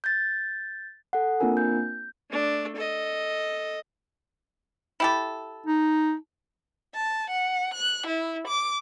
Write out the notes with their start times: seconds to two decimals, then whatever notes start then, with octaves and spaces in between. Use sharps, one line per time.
0.04 G6 A6
1.13 A4 F#5
1.40 A#3 C4 D4 F4 A#4 G#5
1.57 G6
2.29 A3 D4
2.76 A4 D#5
5.00 E4 G4 A4
5.66 D#4
6.95 A5
7.30 F#5
7.74 F#6
8.07 E4
8.47 D6